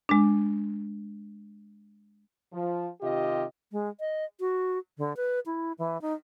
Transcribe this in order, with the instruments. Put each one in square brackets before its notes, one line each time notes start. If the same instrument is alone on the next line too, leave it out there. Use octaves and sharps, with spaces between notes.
[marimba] G#3 D4
[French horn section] F3
C3 D#3 F4 G4 D#5
[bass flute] G#3
D#5
F#4
D3
B4
E4
E3
D#4